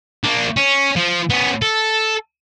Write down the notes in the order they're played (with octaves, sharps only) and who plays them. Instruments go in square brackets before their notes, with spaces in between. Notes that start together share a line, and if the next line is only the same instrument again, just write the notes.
[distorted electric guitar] A#3 D4
C#4
F3
B3 C#4
A4